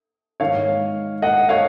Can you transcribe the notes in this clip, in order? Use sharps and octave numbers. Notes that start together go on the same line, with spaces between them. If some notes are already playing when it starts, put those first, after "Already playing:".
G#2 D#3 C#5 F5
D#5 F#5
C#5 F5